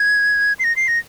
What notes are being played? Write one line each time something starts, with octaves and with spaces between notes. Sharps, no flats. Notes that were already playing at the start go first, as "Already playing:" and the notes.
Already playing: G#6
C7
A#6
C7
A#6